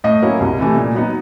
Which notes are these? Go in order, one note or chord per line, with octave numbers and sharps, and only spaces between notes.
A2 D#5
F#3 A#3 C#4 E4
C2
C3 E3 A3
A#2
F#3 B3 D#4